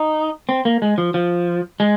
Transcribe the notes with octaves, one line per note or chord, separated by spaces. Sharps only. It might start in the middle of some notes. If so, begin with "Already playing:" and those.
Already playing: D#4
C4
A#3
G#3
F3
F3
G#3